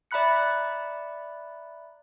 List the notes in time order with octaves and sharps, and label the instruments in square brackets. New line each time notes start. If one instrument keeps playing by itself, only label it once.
[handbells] D5 E5 A#5 B5 F#6 C#7